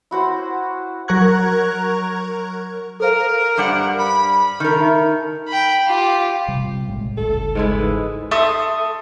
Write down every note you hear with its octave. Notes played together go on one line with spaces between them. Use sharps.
E4 F#4 C5
F#3 A#4 A#5 C#6 F#6 G#6
A4 A#4 C5 F5
G2 G3 F#5
B5
D#3 A#4 F6
D#4 E5
G5 B5
F4 G4
C3 G3
A#1 A2 G#3
G1 C#2 G2 A4
G#2 G#3 E4
E3
A4 E5 C6 D#6